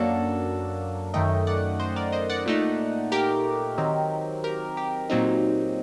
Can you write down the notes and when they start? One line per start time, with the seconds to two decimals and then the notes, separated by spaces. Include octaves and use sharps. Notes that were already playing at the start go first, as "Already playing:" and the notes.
Already playing: F#2 F#3 A#3 D4 F#4 A4
1.14 F#2 D#3 A3 D#5 G5
1.47 D5 F#5
1.79 C5 D#5
1.96 A#4 D5
2.12 C5 D#5
2.30 D5 F#5
2.46 A#2 A3 D#4
3.12 G4 A#4
3.78 D#3 F#3 C4 D#4
4.44 G4 A#4
4.77 G4
5.10 A#2 F#3 C4 D#4